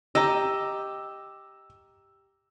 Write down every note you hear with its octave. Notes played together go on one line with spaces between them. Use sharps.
G4 D#5 A#5 E6